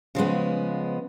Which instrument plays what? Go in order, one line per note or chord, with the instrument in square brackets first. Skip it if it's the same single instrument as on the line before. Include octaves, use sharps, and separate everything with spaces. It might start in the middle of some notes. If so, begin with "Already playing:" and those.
[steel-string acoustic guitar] C#3 F3 G#3 B3